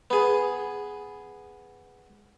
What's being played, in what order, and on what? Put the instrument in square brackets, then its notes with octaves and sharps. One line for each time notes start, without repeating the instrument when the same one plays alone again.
[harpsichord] B3 G#4